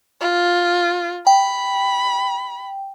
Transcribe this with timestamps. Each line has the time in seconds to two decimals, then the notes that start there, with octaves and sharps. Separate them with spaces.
0.21 F4
1.27 G5 B5